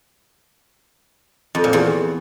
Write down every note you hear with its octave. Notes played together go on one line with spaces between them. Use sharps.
F2
A#2
E2